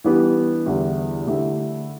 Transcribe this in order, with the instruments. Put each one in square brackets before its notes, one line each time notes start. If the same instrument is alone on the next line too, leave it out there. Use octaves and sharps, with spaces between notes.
[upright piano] E3 G3 B3 D4 G4
E2 D3 G3 E4 G4
D3 A3 E4 G4